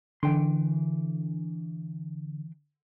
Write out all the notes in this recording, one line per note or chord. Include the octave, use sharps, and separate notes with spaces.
D3 E3 G5 C6